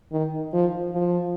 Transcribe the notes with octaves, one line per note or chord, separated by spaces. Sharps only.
D#3
F3
F3